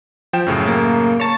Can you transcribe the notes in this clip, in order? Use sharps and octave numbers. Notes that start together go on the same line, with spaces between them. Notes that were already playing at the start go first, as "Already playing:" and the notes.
F3 G5 E7
F#2 A2 C#3
A#3
C#5 A5